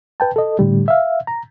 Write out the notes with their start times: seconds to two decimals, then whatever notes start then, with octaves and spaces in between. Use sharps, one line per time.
0.20 B4 G5 A5
0.36 A4 D#5
0.59 A2 D3 G3
0.88 E5 F5
1.27 A#5